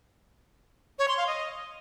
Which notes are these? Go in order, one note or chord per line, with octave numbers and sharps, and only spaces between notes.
C#5
C6
F5
D#5